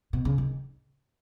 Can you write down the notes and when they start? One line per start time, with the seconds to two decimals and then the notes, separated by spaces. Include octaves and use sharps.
0.13 B2
0.25 C#3
0.38 D#3